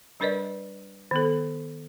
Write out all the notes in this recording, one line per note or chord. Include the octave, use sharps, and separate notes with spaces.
G3 D4 A#4 B4 D5 D#5
D#3 B3 A4